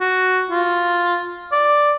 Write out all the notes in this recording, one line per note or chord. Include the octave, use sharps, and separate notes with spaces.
F#4
F4
D5